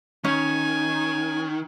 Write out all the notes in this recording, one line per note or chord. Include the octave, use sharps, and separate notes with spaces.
D#3 C#4 G#5